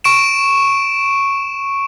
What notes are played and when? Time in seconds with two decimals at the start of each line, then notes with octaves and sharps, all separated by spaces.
0.04 C#6 D7 E7